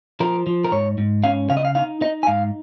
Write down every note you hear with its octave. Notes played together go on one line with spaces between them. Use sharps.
F3 A#4
F3
A#4
G#2 C#5
G#2
C#4 F5
C#3 F5
D#5
F5
D#4 F5
D#4 D#5
G#5
G#2 F5